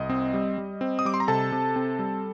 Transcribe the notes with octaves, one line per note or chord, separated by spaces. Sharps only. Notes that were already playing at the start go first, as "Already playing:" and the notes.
Already playing: C2 D#5 D#6
C4
G3
G3
C4
D#6
G3 D6
C6
A#5
C3 A4 A5
C3
C4
G3